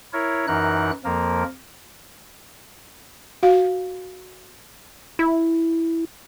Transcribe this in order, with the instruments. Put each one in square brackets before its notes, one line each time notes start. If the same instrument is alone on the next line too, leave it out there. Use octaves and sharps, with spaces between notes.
[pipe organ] E4 A#4 C#5
F#2 E3 D#4 A#4 F#6
F2 F3 A#3 A#4
[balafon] F#4 F5
[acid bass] E4